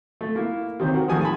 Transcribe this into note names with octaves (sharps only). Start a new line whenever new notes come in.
A3
A#3 E4
C3 D#3 C#4 C5
F#4 A#4 F#5
D#3 F3 G3 A3 G#5 D#6
G#5 A5 B5